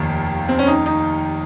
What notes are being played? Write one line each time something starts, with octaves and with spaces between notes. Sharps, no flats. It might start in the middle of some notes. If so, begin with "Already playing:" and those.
Already playing: F1 D#2 D#3 A#3
C4
C#4
D#4
D#4